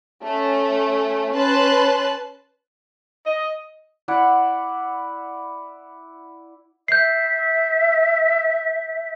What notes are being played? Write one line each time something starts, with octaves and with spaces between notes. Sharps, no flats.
A3 C#4
C#4 B4 A5 C6 F#6
D#5
E4 D5 F#5 D6
E5 G6 C7